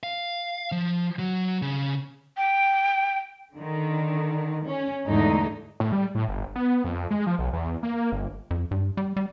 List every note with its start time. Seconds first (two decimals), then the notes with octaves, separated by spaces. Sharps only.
0.03 F5
0.72 F3
1.19 F#3
1.62 C#3
2.37 G5
3.55 D3 D#3
4.67 C#4
5.06 E2 G#2 D3 G#3 A3 D#4
5.80 A2
5.92 G3
6.15 A2
6.28 G1
6.55 B3
6.84 F2
7.10 G#3
7.27 F3
7.39 B1
7.53 E2
7.83 A#3
8.12 G1
8.51 F2
8.71 G2
8.97 G3
9.17 G3